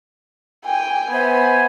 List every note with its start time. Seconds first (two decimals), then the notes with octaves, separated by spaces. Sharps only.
0.65 G5 G#5
1.11 B3 C5 E5 G#5